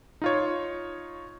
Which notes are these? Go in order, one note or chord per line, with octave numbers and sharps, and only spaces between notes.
D#4 F4 C#5